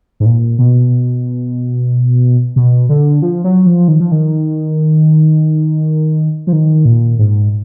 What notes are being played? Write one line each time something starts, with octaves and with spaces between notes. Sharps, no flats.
G#2
A#2
B2
B2
D3
F3
F#3
F3
D#3
F3
D#3
F3
D#3
A#2
G#2